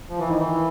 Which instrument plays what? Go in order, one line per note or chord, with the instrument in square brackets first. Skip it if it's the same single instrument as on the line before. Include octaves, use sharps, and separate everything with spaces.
[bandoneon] F3
E3
D#3
E3